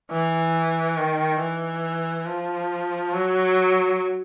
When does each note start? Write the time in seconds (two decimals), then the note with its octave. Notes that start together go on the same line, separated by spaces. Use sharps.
0.11 E3
0.98 D#3
1.40 E3
2.26 F3
3.12 F#3